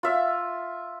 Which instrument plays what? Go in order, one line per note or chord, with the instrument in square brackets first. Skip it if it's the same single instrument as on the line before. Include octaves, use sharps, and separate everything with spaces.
[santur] F4 E5